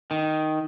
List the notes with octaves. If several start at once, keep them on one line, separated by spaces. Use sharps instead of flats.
D#3